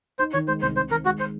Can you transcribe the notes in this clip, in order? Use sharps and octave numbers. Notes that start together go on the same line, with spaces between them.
D#4 C5
D#3 C#5
G#3 C5
C2 C5
C4 C5
D#3 A#4
G#3 F#4
C5